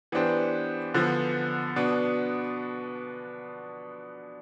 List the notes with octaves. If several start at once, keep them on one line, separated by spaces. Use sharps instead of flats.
E3 B3 D4 G4 C5
D3 F3 B3
B2 B3 D4